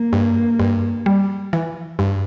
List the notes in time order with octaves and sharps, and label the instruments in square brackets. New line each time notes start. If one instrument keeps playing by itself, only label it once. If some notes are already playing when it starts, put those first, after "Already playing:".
Already playing: [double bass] A#3
[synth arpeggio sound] G2
G2
G3
E3
G2